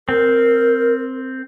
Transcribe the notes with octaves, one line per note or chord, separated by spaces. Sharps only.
C4 A#4